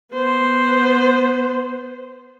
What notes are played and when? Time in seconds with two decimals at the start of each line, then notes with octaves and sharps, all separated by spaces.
0.13 B3 C5